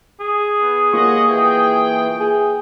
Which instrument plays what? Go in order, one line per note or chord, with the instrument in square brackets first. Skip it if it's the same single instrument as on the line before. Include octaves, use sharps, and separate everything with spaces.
[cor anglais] G#4
[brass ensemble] B3
[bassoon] D#2 [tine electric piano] A#3 F4 C#6 [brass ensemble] C#5 D#5 F#5
[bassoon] E3 [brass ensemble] G5
[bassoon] G#4